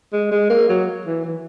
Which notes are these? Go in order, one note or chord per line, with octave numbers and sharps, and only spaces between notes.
G#3
G#3
A#3
F#3
E3
E3